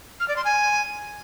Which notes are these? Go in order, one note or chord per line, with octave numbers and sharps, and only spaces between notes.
F6
D5
C6
G#5